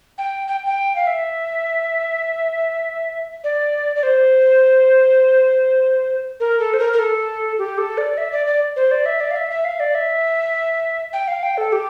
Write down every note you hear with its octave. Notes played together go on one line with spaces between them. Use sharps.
G5
G5
G5
F5
E5
D5
D5
C5
A#4
A4
C5
A#4
A#4
A4
G4
A4
D5
E5
D5
D5
C5
D5
E5
D5
F5
E5
E5
F5
D5
E5
G5
F5
G5
A4
G4